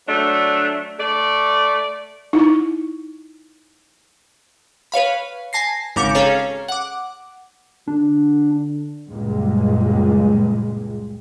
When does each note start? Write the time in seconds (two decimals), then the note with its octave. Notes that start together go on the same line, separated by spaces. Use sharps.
0.07 F#3 A3 D4
1.00 A3 D5
2.33 D#4 E4
4.92 B4 C#5 F5 B5
5.53 G#5 A5 A#6 C7
5.96 G#1 C#3 A#4 D6 G6 C#7
6.15 C#4 G#4 A4 C#5 F5 A#5
6.68 F#5 D6
7.88 D3 D4
9.10 F#1 C#2 A#2 G3 G#3